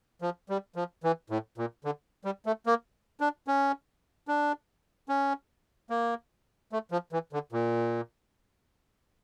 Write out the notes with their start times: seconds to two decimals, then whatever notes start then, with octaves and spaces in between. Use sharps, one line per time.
0.22 F3
0.49 G3
0.76 F3
1.04 E3
1.30 A2
1.58 A#2
1.85 D3
2.25 G3
2.46 A3
2.66 A#3
3.20 D4
3.48 C#4
4.28 D4
5.09 C#4
5.90 A#3
6.72 A3
6.91 F3
7.13 E3
7.33 D3
7.52 A#2